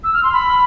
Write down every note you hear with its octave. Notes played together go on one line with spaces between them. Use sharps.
E6
F6
C6
B5